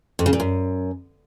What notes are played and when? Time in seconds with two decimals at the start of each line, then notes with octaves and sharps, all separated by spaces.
0.19 F2
0.26 C#3
0.33 A#2
0.40 F#2